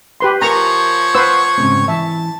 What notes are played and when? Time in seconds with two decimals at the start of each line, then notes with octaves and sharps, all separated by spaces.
0.20 G4 B4 C6
0.42 F3 A#4 C#5 G#5 A#5 C#6
1.15 B4 C5 F#5 E6
1.57 G#2 C#3 C4
1.88 E3 E5 A5